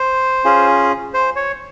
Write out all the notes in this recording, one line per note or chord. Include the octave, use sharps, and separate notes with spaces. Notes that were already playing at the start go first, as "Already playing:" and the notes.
Already playing: C5
C#4 F4 G#4
C5
C#5